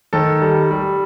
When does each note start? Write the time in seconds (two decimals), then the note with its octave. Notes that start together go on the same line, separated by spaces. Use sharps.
0.13 D#3 A4
0.41 G3
0.71 G3